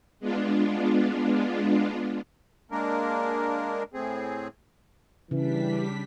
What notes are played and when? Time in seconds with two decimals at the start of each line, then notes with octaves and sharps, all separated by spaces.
0.20 G#3 B3 D4 F4
2.71 G#3 A#3 D4 A#4
3.94 A2 C4 G#4
5.31 C#3 E3 G3 D4 B6